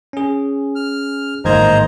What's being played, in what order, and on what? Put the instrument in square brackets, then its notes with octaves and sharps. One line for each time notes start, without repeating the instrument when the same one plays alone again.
[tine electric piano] C#4 G#4
[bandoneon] F6
[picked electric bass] A1 G#2 [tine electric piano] D#3 A#3 G#6 [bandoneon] C5 D#5 A#5